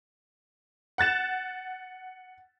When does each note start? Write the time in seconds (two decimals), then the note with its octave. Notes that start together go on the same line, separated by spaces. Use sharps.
0.98 F#5 F#6 A6 E7